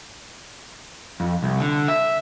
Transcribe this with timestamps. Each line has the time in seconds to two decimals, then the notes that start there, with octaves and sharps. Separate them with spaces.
1.20 F2
1.43 C2
1.60 D3
1.88 E5